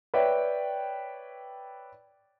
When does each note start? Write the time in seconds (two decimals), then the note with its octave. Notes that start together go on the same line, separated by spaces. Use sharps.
0.14 B4 C#5 D5 E5 G5